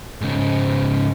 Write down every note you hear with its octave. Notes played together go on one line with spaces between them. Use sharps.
G#2 C#3